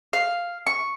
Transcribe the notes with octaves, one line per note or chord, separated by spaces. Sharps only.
F5
C#6